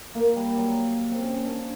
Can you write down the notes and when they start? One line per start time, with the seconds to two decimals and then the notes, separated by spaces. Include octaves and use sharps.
0.15 A#3
0.36 G3
0.57 F#3
1.11 C4
1.23 C#4
1.34 C#4
1.44 D4